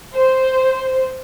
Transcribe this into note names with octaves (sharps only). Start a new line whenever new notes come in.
C5